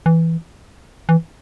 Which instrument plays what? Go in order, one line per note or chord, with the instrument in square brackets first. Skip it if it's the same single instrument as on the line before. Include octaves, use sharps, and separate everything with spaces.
[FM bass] E3
E3